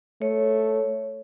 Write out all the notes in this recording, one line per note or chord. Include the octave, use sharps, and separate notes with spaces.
A3 C#5